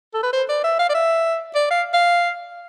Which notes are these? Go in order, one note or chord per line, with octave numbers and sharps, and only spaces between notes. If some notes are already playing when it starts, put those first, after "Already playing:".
A4
B4
C5
D5
E5
F5
D5
E5
D5
F5
F5